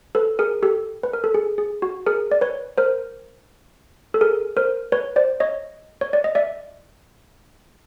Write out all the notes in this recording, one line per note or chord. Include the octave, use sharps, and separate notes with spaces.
A4 B4
G#4 A#4
G4 A4
B4
A#4
A4
G#4
G#4
F#4
G#4 A#4
D5
B4 C#5
A#4 C5
A4
G#4 A#4
A#4 C5
B4 C#5
C5 D5
C#5 D#5
C#5
D5
D#5
D5 E5